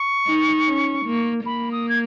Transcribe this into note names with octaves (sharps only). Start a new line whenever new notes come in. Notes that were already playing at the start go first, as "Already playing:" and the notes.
Already playing: C#6
D#4
C#4
A#3
A#3 B5
D#6
G#6